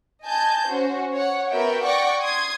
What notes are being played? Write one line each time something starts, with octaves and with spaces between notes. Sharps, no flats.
D#5 G#5 A5 G6
C#4 F#4 C5
C#5 F#5
B3 F#4 A#4 E5 G5
D5 F#5 G5 C#6 D6 A#6
C6 D#6 G#6